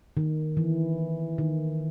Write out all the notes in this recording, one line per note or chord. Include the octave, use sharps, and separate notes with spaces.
D#3
E3
D#3